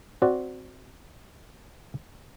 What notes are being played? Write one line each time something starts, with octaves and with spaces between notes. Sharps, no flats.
C4 F#4 D5